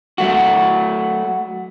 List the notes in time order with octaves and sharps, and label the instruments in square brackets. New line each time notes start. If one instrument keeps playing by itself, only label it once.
[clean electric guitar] F#3 A3 F#4